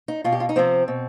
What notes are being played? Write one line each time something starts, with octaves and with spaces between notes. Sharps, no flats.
D#4
B2 F4
G4
F4
D#4
C3 F3 C4
B2